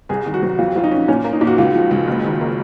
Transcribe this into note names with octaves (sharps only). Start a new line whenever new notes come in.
C2 G#4
D#3
F#4
F#3
F2 F4
F#3 F4
D#4
C#4
A#2 C#4
A#3
D#4
A#2
F#4
C#2 F4
F3
C#2
F#1
D#3
A#3